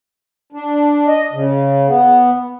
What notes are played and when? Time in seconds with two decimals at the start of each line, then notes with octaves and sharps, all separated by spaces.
0.53 D4
1.08 D#5
1.33 C#3
1.88 B3